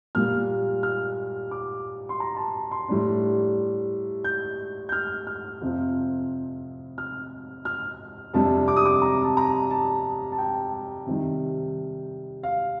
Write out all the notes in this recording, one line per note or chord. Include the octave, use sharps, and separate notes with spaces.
A#2 G3 A#3 F6
F6
D6
C6
A#5
A5
C6
A2 G3 D4
G6
G6
F6
F6
F2 C3 F3
F6
F6
F2 C3 G3 D4 A5
D6
D#6
D6
A#5
A5
A#5
A5
A5
G5
C3 D#3 G3
F5